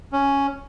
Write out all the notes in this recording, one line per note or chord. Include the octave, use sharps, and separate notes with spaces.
C#4